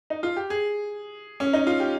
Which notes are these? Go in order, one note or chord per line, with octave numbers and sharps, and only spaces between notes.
D#4
F4
G4
G#4
C#4
D#4
F4
G4